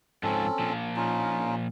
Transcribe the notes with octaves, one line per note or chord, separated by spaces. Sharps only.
G#2 F3 C4 C#4 A4
A#2 F3
C#4 D#4 F4